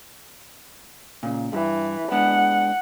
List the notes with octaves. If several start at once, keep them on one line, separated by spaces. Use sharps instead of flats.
A#2 C#3
G2 E3
G#3 B3 D4 F#5